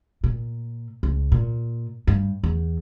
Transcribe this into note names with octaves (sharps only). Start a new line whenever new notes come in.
A#2
C#2
A#2
G2
E2